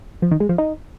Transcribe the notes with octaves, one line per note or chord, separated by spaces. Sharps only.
F3
D#3
G#3
F3
D#4